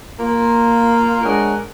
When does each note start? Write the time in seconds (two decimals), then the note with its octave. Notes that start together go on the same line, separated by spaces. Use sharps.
0.19 A#3 F4
1.23 G#3 D4 A#4 C#5 D#5 F#5